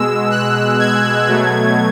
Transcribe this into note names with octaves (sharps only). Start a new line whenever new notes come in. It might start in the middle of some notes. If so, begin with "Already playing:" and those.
Already playing: B2 G#3 E6
F#6
G#6
B2 F#3 A3